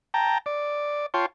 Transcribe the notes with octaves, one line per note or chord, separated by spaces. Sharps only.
G5 A5 A#5
D5
F4 C#5 G5 A5 C6